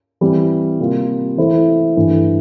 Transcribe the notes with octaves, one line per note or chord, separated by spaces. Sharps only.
E3 G3 C4
C3 G3 A#3 F4
E3 A3 E4 A4 C5
G2 E3 A3